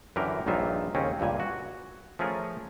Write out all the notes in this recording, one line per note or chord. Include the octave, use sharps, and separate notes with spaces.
F#2 D3 E3 G4 A#4
A#1 G2 F#3 D#4 F4 E5
D#2 C#3 C4 C#4
C#2 G2 A#2 G#5
F#4
F3 A3 C#4 G#4 A#4